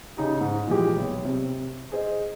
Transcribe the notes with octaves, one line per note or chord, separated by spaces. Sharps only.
C#3 D#4 G4
G#2
A#2 E3 F3 G#3 G4
B1
C3
G#4 C5 D#5